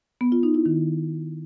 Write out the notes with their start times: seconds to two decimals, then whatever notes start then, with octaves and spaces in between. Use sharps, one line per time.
0.21 B3
0.32 F4
0.43 D#4
0.54 E4
0.66 D#3